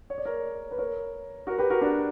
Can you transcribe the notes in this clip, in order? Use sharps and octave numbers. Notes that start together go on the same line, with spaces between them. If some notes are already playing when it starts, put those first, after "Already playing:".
C#5
D5
A#4 C#5
B4
A#4 C#5
F#4 A#4
G4 B4
F#4 A#4
D4 F#4